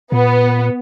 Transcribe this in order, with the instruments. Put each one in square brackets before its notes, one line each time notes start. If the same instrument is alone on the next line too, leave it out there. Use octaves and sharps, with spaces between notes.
[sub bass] A#2 [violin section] B3